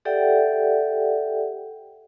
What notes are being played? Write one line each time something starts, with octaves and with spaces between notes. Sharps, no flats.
G4 A4 D5 E5 F#5 G5